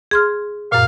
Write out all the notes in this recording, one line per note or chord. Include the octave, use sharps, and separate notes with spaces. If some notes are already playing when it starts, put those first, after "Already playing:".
G#4 C6 F6
F#2 A#2 F5